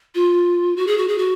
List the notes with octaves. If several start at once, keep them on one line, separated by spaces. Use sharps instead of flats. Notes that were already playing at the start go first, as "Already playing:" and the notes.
F4
F#4
G#4
F#4
G#4
F#4